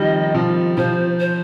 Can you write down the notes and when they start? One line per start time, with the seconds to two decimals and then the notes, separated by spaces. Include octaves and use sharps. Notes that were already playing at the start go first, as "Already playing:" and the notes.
Already playing: D#3 F3 G3 D#5
0.35 F3
0.77 F3 C5
1.20 C5